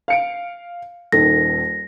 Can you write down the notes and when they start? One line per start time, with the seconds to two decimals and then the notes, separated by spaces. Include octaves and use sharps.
0.08 F5 C#7 D7
1.12 D#1 D#3 A4 A#6